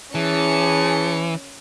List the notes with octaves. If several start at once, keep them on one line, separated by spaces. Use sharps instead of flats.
E3 C#4 G#4 A5 C#7